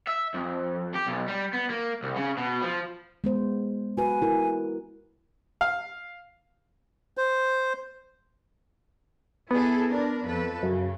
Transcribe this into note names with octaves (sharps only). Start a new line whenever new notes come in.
E5
F2
G4
B1
G3
B3
A#3
C2
C#3
B2
F3
G#3 B3 C5
F#4 B4 G#5
E4 A#4
F5
C5
B3 E4 G#4 A4
D4 A#4
F2 A4 B4
F#2 C#3